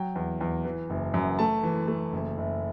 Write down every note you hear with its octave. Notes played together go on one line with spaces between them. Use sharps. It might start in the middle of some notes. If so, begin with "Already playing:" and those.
Already playing: F#3 G5
E2
E2
E3
F#1
F#2
A3 A5
E3
A3
F#1
F#1